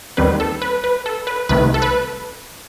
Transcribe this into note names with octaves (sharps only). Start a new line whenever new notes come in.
D#2 D#3 G3 C4 B4
A4
B4
B4
A4
B4
C2 C3 D#3 A3 B4
A4
B4